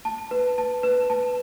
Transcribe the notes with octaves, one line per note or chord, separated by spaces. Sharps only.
A5
B4
A5
B4
A5